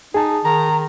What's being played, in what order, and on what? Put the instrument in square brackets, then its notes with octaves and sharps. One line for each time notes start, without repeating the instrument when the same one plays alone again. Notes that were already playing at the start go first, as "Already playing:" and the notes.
[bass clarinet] D#4 [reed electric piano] G#4 A5
[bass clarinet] D#3 [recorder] A#5